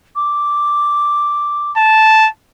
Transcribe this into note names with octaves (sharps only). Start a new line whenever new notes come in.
D6
A5